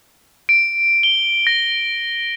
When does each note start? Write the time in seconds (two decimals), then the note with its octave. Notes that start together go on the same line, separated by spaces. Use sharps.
0.49 D7
1.03 G7
1.47 A#6